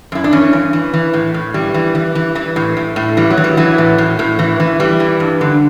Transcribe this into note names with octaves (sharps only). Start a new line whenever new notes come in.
F#2 E4
D4
E3 C#4
G2
E3
E3
A2
A2
E3 G3
E3
E3
E3
E3
A2
A2
A2
E3 G3
F#3
E3
G3
E3 F#3
A2
A2
A2
E3
E3
E3 G3
E3
G2
D3